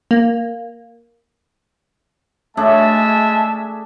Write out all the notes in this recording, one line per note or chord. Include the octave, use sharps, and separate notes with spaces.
A#3
G#3 A3 D4 G#4 E5 A5